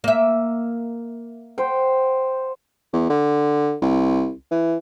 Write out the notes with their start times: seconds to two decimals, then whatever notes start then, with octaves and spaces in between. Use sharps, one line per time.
0.04 A#3 E5
1.58 C5 F#5 G5
2.93 E2
3.09 D3
3.82 C2
4.51 E3